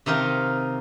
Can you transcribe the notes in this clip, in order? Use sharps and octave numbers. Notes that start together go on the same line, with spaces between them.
C3 D#3 D#4 F4 A#4